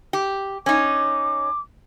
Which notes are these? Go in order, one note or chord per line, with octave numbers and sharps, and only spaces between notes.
G4
C#4 D#4 D6